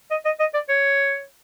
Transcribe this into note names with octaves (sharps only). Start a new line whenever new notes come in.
D#5
D#5
D#5
D5
C#5